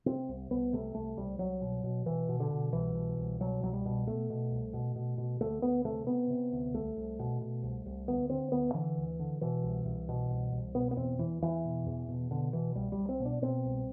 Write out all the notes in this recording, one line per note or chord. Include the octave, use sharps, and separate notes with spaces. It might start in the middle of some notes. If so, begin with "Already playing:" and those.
C3 C4
C2
C2 B3
C3 A3
C2 A3
C2 G3
C2 F#3
B2
B2
B2 E3
B2
D3
B2
C2 E3
B2
C2
B2 F#3
C2 F#3
G3
B2
B2 A3
B2
C2
B2
B2
B2
D2 A3
D2 B3
C3 A3
C3 B3
C3
D2
C2 A3
C2
B2
B2
C2
C2
D2 B3
D3 C4
D2 B3
D3 E3
D2
D3
B2 E3
C2
C2
B2
C2
C2
B2 B3
B3
E2 C4
E2 E3
E2 E3
B2
E2
B2
B2 D3
B2 E3
C2 G3
G3
C2
C4
B2
D4
B2 C4
C2